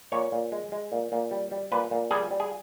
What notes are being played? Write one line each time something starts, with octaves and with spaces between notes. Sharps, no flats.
A#2 C#5
A#2
G#3
G#3
A#2
A#2
G3
G3
A#2 B4
A#2
G3 G#4
G3
G#4